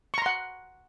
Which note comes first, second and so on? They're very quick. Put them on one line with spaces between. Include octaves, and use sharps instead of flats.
C#6 A#5 C6 F#5